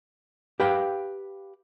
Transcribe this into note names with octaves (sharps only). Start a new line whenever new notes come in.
G4 B4 F5 G5